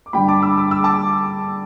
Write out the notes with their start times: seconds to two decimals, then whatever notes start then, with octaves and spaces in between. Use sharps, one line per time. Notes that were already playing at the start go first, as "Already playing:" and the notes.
0.06 D6
0.13 G2 D3 G3 G5 B5
0.28 A5 D6
0.42 B5 E6
0.57 D6
0.71 E6
0.84 A5 D6